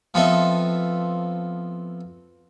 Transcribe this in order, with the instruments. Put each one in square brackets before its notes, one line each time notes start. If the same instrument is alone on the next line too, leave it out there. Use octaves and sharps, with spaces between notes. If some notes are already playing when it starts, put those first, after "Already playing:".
[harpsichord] F3 B3 C4 A4 D#5 E5